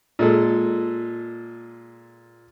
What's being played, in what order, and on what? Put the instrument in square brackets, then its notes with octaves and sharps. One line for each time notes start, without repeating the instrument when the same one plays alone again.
[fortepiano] A#2 G#3 A4